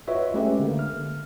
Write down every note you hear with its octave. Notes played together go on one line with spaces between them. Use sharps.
F4 F#4 B4 C#5 D#5 E5
G#3 A3 C#4 G4 B4 E5
D3 A#3
F6